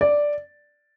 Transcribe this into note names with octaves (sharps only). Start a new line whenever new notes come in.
D5